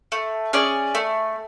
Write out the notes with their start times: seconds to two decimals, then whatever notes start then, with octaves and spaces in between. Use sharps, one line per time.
0.12 A3
0.53 C#4 G#4 D5
0.95 A3